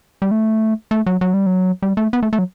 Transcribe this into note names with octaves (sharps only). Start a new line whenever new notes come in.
G3
A3
A3
F#3
F#3
G3
F#3
G3
A3
B3
A3
A3
F#3